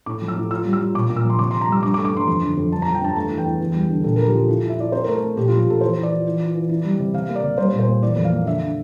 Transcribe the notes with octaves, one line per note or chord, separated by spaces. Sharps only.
A2 D6
F3
E6
A2
F4 E6
G3
E6
F4
A#2 D6
A#2
E6
F3 C6
C3 D6
C3 C6
A#5
G3 E6
G2 D6
D6
A3
D6
G2 C6
F2 C6
D3
F2
G2 A5
F3 A#5
G5
G2 A5
A3 A5
E3
G5
E2
E2
G3
D3
A#2 A4
F3 A#4
G4
F4 A4
E4
E4
E5
E4 D5
C4 C5
A3 A#4
A4
A3
A#2 G4
F3 F4
G4
A#2 A4
E3 C5
E3
D5
F4
E3
F4
E3
E4
G3
C3
C3 F5
A#3
D5
C3
G3 C5
A#2
C5
A#3
E3 D5
F2
F5
A#3
D3 E5
D3